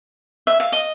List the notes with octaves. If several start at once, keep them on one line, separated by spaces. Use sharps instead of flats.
E5
F5
D#5